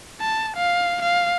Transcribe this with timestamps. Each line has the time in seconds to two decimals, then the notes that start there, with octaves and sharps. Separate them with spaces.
0.20 A5
0.57 F5
1.02 F5